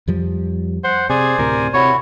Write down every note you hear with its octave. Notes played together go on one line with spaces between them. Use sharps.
F2 F3 G3
C5 F#5
C3 G#4 C5 D5 G#5
D2 A2 C3 A#4
C3 E4 F#4 C#5